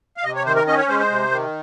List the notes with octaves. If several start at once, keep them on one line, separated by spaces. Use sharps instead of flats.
F5
C3 D#5
C#5
D#3 C5
A#4
C#4 D#5
C#5
G#3 C5
C5
C3
D#3